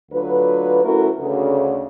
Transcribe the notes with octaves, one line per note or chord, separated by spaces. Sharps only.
D2 D3 F#3 F4 B4
A3 C#4 E4 F#4 A#4 B4
D2 C#3